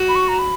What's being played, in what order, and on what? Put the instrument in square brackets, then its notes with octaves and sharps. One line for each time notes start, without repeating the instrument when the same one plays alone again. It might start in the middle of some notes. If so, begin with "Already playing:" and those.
Already playing: [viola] F#4
[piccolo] B5
C#6
A#5
B5